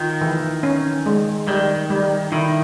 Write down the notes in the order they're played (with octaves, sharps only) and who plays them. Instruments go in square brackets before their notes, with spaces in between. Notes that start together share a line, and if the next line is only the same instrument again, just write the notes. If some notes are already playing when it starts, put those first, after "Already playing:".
Already playing: [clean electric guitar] D#3 [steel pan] F4
[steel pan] E3
C#4
G#3
[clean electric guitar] D#3 [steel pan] G3
[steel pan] G3
[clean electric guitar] D#3 [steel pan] E4